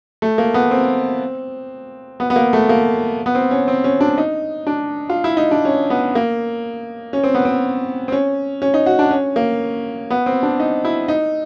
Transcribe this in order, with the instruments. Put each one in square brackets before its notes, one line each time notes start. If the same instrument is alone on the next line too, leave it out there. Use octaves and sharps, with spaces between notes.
[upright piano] A3
A#3
B3
C4
B3
B3
A#3
A3
A#3
B3
C4
C#4
C4
C#4
D4
D#4
D4
F4
E4
D#4
D4
C#4
B3
A#3
C#4
C4
B3
C4
C4
C#4
C#4
D#4
F#4
D4
C#4
A#3
B3
C4
D4
D#4
E4
D#4